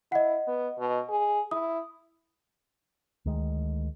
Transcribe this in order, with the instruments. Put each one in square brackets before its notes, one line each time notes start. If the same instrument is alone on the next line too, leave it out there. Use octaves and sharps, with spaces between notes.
[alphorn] E4 [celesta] D#5 F#5
[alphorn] B3
B2
G#4
[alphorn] E4 [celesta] D#6
[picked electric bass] D2 D#3 G#3